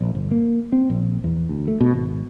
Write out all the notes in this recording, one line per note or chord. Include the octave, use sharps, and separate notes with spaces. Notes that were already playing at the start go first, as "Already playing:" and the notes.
A#1
G1
A#3
C4
A#1
E2
D2
A3
B2
G#1